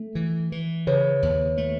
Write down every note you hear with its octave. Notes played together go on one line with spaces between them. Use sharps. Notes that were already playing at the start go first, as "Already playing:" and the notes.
Already playing: A3
E3
E3
C#3 B4 C#5
D#2
A3